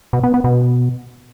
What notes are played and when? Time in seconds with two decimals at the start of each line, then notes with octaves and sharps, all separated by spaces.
0.13 B2
0.23 B3
0.34 B3
0.44 B2